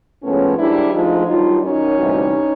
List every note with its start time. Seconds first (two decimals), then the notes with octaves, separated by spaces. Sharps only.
0.23 A2 F3 G#3 B3 C#4
0.57 G#2 D#3 G3 D4 E4
0.92 D2 D3 F3 G#3 D#4 F4
1.27 G2 D#3 F#3 D#4 F4
1.62 F#2 D#3 F#3 C#4 D#4
1.96 D2 C3 E3 G3